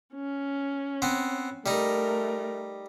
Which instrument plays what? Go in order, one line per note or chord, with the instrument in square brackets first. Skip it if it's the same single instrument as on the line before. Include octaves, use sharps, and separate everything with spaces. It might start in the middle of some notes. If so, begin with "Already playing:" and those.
[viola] C#4
[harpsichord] B3 C4
[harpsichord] G3 D#4 [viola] A3 A#4